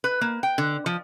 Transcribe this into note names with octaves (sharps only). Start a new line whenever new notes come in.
B4
A#3
G5
D3
F3